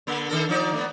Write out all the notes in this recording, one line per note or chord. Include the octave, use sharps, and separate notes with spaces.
D3 A#3
D#3 A4 A#4
F3 D#4 D5
A3 B3